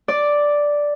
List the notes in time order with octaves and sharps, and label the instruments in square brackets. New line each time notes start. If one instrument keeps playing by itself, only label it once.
[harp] D5